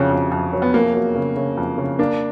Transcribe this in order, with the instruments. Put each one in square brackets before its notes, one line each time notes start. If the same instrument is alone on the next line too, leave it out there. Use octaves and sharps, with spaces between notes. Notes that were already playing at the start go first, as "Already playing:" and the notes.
Already playing: [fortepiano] F2 C#3 F#3
F2
F2
F#3
[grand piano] B3
[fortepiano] F2 [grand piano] A#3
[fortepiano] F#3
C#3
C#3
F2
C#3
[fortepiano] A#3 [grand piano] D4